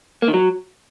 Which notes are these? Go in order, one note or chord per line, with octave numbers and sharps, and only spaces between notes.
A#3
D#3
F#3